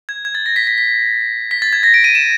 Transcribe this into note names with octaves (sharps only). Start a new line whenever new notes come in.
G#6
G#6
A6
A#6
B6
B6
B6
B6
A6
G#6
A#6
D7
D#7
E7